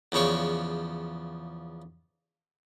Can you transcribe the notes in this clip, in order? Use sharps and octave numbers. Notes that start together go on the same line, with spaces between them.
E2 C#3 F3 C#5 D5